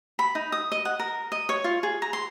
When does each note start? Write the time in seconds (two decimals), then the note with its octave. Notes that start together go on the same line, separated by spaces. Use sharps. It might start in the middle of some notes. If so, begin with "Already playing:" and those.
0.19 B5
0.35 D#4
0.52 D#6
0.72 D#5
0.85 F#5
0.99 A#4
1.32 D#5
1.49 C#5
1.64 F4
1.83 G#4
2.02 A#5
2.13 C6